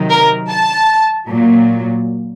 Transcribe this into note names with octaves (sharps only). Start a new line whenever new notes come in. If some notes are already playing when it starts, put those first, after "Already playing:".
Already playing: C3 D#3 F#3
A#4
A5
A#2 F#3